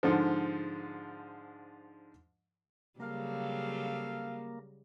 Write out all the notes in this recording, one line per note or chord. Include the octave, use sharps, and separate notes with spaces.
G#2 D3 F3
C#3 F#3 G3 A#3 C4 A4 F5